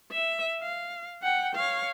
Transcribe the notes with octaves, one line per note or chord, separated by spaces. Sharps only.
E5
F5
F#5 G5
C#5 F5